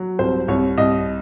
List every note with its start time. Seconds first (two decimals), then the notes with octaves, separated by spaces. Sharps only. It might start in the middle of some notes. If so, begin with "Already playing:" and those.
Already playing: F#3
0.19 C2 C5
0.48 C2 C#5
0.78 C2 D#5